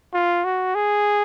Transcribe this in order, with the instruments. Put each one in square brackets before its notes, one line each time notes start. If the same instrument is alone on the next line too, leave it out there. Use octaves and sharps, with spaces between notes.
[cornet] F4
F#4
G#4